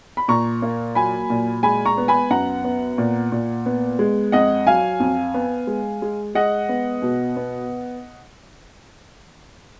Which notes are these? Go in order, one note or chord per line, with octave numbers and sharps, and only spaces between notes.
B5
A#2 A#5 C#6
A#3
F#3 G#5 B5
A#2
G#3 G#5 B5
A#5 C#6
B3
G#5 B5
F#2 F#5 A#5
B3
A#2
A#2
B3
G#3
F2 D#5 F#5
F#3 F5 G#5
F2
B3
G#3
G#3
G#3 D#5 F#5
B3
B2
B3